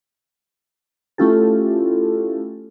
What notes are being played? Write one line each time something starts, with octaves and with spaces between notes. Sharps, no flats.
A3 C#4 E4 F4 G4 A4